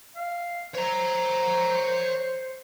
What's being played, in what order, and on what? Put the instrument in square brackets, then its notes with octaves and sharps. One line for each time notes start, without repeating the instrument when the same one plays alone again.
[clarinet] F5
[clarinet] C5 [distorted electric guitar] C#5 A#5